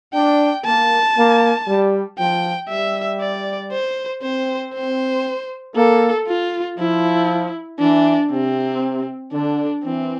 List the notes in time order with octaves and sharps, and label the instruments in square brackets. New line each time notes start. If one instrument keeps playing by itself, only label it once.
[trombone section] D4 [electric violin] G5
[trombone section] A#3 [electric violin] A5
[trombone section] A#3
G3
[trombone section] F3 [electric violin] G5
[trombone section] G3 [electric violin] E5
[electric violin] D5
C5
[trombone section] C4 [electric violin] C5
[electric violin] C5
[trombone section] A#3 [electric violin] A4
[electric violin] F4
[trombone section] F3 [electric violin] E4
[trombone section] E3 [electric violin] D4
[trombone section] C3 [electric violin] C4
[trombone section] D3 [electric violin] D4
[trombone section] E3 [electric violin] C4